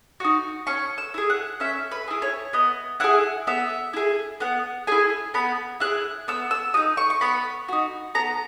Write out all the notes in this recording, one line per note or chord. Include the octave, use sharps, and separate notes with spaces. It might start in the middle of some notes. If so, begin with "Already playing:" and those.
D#4 F#4
C#4 C#6
E6
E4 G#4
F#5
C#4 E5
B4
E4 G#4
C#5
B3 D#5
E4 G#4 F#5
B3 E5
E4 G#4
B3 F#5
E4 G#4 G#5
B3 B5
E4 G#4 F#6
B3 E6
E6
D#4 F#4 D#6
C#6
C#6
B3 B5
D#4 F#4
B3 A#5